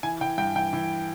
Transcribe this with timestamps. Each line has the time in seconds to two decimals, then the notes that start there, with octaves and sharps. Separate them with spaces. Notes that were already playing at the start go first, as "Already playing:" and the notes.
0.03 E3 G#5
0.21 E3 G5
0.38 G2 G5
0.55 E3 G5
0.73 E3